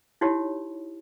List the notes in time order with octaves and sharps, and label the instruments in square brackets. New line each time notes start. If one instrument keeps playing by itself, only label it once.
[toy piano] D#4 E4 F#4 G4 C#5